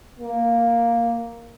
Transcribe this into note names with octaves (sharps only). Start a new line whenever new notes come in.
A#3